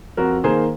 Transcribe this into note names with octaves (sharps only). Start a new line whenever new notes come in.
F2 F#4 A#4
D#3 A#3 G#4 C5